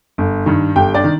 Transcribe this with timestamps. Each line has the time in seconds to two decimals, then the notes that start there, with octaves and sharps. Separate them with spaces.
0.18 G1
0.46 G2 D#3
0.76 G1 G4 G5
0.94 D4 D5
1.04 D#3